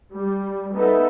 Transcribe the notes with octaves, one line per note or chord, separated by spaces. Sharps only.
G3
B3 D#4 A4 E5